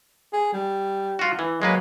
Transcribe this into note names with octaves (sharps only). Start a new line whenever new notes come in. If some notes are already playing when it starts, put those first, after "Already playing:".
G#4
G3
F4 F#4
E3
F#3 G#3 A#3 B4